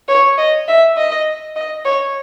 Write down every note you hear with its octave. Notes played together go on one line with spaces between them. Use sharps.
C#5
D#5
E5
D#5
D#5
C#5